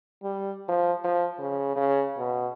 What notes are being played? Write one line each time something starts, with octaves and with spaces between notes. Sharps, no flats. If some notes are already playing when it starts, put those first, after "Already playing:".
G3
F3
F3
C#3
C#3
B2